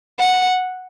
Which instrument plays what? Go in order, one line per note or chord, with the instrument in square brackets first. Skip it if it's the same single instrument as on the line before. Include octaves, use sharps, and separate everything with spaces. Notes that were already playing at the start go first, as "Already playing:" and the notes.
[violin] F#5